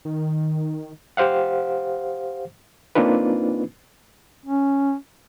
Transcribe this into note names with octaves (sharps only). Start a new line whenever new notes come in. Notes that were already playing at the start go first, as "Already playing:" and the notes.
D#3
G4 C5 F5 F#5
A#3 C4 D4 D#4 F4 B4
C#4